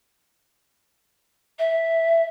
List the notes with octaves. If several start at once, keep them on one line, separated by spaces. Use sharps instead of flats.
E5